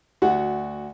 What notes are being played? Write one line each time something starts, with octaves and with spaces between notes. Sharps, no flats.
D2 F#4 F#5